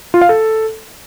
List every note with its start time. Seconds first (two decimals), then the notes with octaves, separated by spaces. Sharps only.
0.14 F4
0.22 F5
0.29 A4